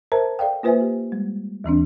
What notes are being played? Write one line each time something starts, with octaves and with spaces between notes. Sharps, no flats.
A#4 C5 E5 A5 A#5
A4 D5 F5 G5
A#3 F4 B4 C5 E5 G#5
G4
G3 G#3
D#2 E3 C4 D4